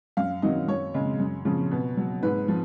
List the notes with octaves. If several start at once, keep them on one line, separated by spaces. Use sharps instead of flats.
F#2 F5
D#3 F#3 D#5
F#2 C#5
C#3 G#3
F#2
C#3 F3
B2
F#3
G#2 B4
F3